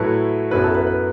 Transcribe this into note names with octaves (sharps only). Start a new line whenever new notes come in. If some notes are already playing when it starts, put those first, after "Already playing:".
Already playing: A2 F#3 A3 E4 B4
F#2 F#3 B3 E4 B4
A4
B4
B4